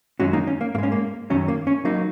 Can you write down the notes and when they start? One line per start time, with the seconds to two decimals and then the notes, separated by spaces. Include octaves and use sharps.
0.20 F#2 D#3 G#3 C#4 F#4
0.33 A#3 D#4
0.47 C#4
0.61 A#3
0.74 G#2 A#3
0.78 G#3 C#4
0.92 A#3
1.30 F#2 D#3 F#3 C#4
1.48 A#3
1.67 C#4
1.85 F#3 A#3 D#4